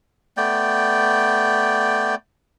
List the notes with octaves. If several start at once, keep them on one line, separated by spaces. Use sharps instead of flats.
A3 B3 D5 G5